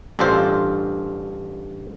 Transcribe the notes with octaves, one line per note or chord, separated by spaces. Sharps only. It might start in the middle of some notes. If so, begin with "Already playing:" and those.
A1 G2 D4 F4 A4 C5